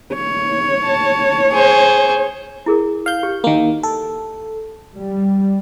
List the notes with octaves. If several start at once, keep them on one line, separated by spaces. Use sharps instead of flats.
C#5
A5
G#4 C5
E4 G#4 A#4
F5 G6
G4
D#3 A#3
A4
G3